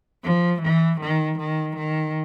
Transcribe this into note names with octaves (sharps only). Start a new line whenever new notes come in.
F3
E3
D#3
D#3
D#3